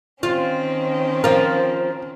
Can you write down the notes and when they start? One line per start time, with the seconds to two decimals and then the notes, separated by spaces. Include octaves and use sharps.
0.23 D#3 C4 C#4 F4
1.24 F3 F4 A#4